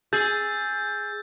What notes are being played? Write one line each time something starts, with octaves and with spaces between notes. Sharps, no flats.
G#4 E6 G6 A6